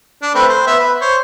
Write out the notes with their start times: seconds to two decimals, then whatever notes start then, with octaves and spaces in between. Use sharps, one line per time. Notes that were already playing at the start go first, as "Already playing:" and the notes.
0.22 D4
0.35 A3 C4 B4
0.49 C5
0.67 B3 E5
0.79 B4
1.01 C5 C#5